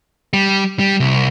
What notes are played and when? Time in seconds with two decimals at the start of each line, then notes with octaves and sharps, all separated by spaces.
0.33 G3
0.79 G3
1.00 C2